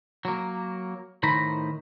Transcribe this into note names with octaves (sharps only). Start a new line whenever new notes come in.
F#3 A#3
A2 D#3 C5 A#5 B5